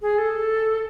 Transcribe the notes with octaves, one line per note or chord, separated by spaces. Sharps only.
G#4
A4